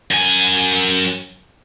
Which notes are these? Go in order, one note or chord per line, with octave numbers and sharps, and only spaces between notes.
F#2 G#5